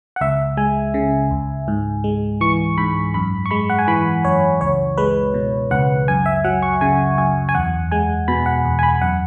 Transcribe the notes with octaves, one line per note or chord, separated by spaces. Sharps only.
F#5
C#2 E5
G#3 G#5
C#3
C#2
G#2
G#3
E3 C#6
G#2 B5
F#2 B5
C#6
G#3 B5
F#5
G#5
E3 B5
F#2 C#5
C#2 C#5
G#3 B4
B2
C#2 F#5
F#2 G#5
E5
F#3 F#5
C#6
C#3 G#5
F#2 G#5
G#5
E2 F#5
G#3 G#5
B2 B5
F#5
E2
G#5
B5
F#2 F#5